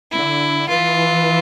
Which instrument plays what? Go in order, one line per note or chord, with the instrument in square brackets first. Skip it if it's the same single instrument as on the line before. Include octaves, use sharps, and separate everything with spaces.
[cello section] D3 [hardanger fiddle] E4
[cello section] E3 [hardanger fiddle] F4